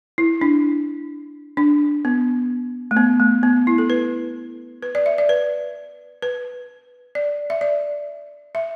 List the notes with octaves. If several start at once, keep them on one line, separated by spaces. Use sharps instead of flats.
E4
D4
D4
B3
A3
B3
A3
B3
E4
A4
B4
B4
D5
E5
D5
B4
B4
D5
E5
D5
E5